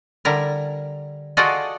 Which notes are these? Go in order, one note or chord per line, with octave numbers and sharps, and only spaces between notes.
D3 G3 E4 A#4
F4 F#4 G#4 A4 D5 D#5